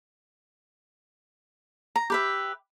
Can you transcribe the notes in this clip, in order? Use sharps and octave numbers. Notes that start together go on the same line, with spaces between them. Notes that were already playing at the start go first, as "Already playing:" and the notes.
A#5
G4 B4 E5